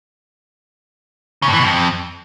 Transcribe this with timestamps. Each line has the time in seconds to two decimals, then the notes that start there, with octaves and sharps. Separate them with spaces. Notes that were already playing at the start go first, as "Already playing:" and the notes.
1.42 C#3
1.48 G2
1.53 E3
1.58 B2
1.64 F2